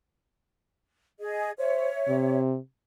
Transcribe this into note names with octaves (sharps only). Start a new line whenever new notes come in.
G#4 D#5
C5 C#5 E5
C3